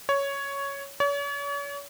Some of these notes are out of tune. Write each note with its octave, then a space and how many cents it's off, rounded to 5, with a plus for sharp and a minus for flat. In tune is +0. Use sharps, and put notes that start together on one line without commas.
C#5 +5
C#5 +40